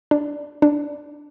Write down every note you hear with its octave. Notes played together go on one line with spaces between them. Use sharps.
D4
D4